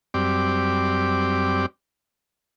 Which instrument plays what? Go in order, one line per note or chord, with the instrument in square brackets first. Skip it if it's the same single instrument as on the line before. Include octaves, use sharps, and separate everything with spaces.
[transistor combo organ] F#2 G3 C4 G4 D5 D6